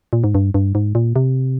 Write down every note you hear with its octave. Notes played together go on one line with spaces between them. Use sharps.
A#2
G#2
G2
G2
G#2
A#2
C3